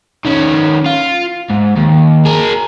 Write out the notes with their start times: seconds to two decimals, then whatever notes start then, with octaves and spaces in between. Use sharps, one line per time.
0.25 D#3 C#4
0.86 F4
1.50 G#2
1.77 D#2
2.26 G#4 A#4